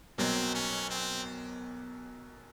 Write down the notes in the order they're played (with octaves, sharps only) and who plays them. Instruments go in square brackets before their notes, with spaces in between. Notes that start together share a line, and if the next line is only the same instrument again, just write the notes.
[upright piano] B1 B2 F#3 A#3 [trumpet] C4
[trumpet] C#4
C4